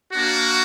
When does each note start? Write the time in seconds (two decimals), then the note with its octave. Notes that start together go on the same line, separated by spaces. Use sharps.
0.14 A#3 D4 F#4